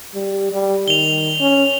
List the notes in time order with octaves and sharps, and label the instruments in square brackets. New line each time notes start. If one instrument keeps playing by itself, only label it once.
[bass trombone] G3
G3
[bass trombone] D#3 [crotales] F7 G7
[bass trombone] C#4